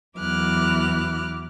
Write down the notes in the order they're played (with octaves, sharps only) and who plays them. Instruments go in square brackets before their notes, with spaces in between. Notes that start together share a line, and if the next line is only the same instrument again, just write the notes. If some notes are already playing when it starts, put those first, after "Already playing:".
[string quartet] E2 F#3 E4 D6 F6 F#6